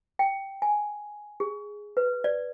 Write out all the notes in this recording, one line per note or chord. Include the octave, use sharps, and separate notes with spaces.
G5
G#5
G#4
B4
D5